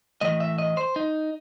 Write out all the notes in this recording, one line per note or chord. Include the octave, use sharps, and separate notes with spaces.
A2 E3 A3 D#5
E5
D#5
C5
D#4